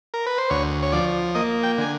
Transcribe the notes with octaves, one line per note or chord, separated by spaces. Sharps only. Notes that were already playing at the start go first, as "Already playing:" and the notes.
A#4
B4
C5
D2 C#5
C#5
F3 D5
A#3 D#5
G5
D3 G#5